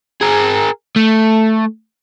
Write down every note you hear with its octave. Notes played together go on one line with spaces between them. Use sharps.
G#4 A#4
A3